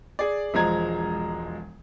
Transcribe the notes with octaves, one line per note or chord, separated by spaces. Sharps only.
G#4 D5
E1 F3 G#3 A#5 G#6